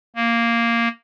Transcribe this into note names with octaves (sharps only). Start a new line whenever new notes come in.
A#3